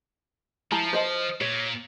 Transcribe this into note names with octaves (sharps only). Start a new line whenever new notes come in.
F3 E4 A5 A#5
C5 D#5 A5
A#2 C#5